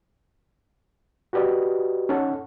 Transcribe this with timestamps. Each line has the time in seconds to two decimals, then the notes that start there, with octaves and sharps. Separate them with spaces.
1.33 F#4 G4 B4 D5 D#5
2.09 C#4 D#4 A4 C#5 F#5